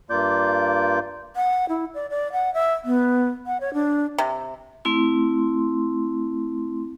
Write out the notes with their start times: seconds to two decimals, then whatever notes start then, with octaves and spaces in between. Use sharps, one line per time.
0.10 G2 A#3 F4 D5 D6 G6
1.36 F#5
1.69 E4
1.94 D5
2.10 D5
2.32 F#5
2.54 E5
2.85 B3
3.46 F#5
3.61 C#5
3.74 D4
4.18 C3
4.85 A3 C4 E4 C6